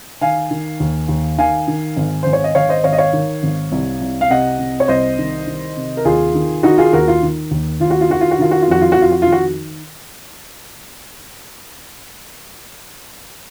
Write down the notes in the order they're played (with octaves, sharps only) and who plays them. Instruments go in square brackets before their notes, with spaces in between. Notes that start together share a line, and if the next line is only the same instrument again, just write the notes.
[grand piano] D#3 F5 G#5
D#3
D#2
D#2
D#3 F5 G#5
D#3
G#1
G#1 C5
C#5
D#5
G#1 C#5 F5
C5 D#5
G#1 C#5 F5
D#5
C#5 F5
D#3
G#1
C2
C2
F5
C3 D#5 F#5
C3
C#5
C2 C5 D#5
D#3
D#3
C3
A#4
D#2 F4 G#4
D#3
D#3 D#4 F#4
F4 G#4
D#2 F#4 A#4
F4
D#3
D#2
D#2 F4
F#4
F4
D#3 F#4
F4
F#4
D#3 F4
F#4
F4
F2 F#4
F4
F#4
F2 F4
F#4
D#3 F4
F#4